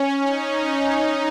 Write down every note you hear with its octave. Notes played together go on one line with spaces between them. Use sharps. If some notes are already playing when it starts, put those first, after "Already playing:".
Already playing: C#4
D#4
D#4